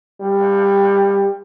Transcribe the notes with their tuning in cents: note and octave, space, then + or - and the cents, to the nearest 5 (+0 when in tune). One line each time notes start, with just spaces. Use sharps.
G3 +20